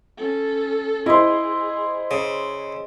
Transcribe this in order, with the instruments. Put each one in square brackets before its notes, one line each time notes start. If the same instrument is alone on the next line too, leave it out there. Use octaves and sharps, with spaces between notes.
[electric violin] C#4 A4
[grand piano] E4 [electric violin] G#4 [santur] C5 D#5
[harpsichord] C#3